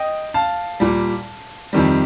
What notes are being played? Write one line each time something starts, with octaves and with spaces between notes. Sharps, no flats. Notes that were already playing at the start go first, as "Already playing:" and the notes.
Already playing: D#5 G5
F5 A5
A#2 G3
F2 C3 D#3 G3